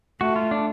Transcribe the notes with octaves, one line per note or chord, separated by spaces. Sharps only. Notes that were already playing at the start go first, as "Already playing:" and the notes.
A3 F#4
F4
D4